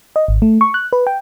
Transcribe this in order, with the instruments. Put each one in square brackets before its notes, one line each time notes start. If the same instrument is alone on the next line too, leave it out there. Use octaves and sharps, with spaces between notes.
[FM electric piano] D#5
G#1
A3
C#6
F#6
B4
G5